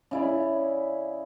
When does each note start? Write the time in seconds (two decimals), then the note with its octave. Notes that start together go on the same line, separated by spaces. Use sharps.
0.11 C#3 E4 D5